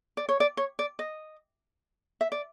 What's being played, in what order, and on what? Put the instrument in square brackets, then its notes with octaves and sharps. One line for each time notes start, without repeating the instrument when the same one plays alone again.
[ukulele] D5
C#5
D5
C#5
D5
D#5
E5
D5